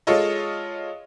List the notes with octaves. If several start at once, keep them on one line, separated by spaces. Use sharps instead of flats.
G#3 F4 A4 C#5 D#5